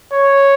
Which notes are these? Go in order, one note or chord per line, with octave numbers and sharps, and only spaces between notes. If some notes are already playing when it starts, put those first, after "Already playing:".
C#5